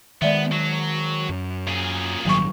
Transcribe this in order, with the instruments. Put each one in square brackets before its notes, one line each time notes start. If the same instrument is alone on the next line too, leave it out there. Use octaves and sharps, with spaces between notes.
[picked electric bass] D#3 G#3 [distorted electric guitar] B3 [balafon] D5 E5
[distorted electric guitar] F#3
[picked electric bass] F#2
[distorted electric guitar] A#2 G#4
[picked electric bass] A1 G2 D#3 [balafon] F#3 C#6